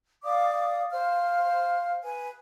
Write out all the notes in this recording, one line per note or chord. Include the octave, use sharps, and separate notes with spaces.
D5 F5 D6 D#6
C5 F5 F6
B4 G#5